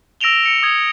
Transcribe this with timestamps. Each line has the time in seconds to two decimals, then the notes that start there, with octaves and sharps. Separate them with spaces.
0.21 E6 A#6 D7 E7 F7 G7
0.46 C#7
0.63 D#6 G#6